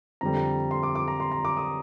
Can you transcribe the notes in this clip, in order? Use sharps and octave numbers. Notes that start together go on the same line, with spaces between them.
F2 D3 G3 A#5
C6
D6
D6
A#5
C6
A#5
D6
D#6